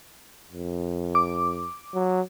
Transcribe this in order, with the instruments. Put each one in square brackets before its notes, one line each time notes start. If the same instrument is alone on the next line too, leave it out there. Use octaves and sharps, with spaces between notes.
[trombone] F2
[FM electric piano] D6
[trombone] F#3